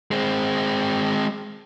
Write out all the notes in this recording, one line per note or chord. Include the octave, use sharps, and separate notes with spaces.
G#3 C4